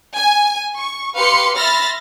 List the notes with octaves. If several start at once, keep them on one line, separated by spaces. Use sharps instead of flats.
G#5
C#6
G4 B4 F5 C6 C#7
E5 B5 C6 F6 A6 A#6